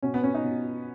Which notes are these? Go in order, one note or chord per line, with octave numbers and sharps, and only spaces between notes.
B2 C#4
B3
C#4
D#4
B2